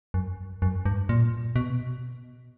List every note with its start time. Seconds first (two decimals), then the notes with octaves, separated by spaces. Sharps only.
0.14 F#2
0.62 F#2
0.85 G2
1.09 A#2
1.56 B2